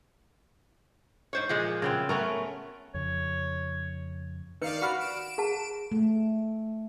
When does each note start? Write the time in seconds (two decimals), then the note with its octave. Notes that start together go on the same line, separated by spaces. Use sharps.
1.33 G#2 C5 C#5
1.49 A#2 F3 G#3
1.82 C#3 B3 C4
2.09 A3 B3 C#4 A#4
2.94 F2 C#3 C#5
4.62 D#3 B4 D5 F5 C#7
4.82 F#4 B5 F6
5.00 D7 E7
5.38 G#4 F#5 A5
5.92 A3